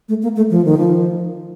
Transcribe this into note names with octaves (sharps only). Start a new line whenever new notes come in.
A3
A#3
A3
F3
D#3
F3